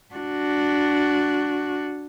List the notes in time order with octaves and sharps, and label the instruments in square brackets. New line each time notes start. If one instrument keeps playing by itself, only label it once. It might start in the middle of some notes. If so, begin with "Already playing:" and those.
[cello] D4 F#4